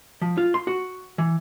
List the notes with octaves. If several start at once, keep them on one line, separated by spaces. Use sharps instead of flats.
F3
F4
C6
F#4
E3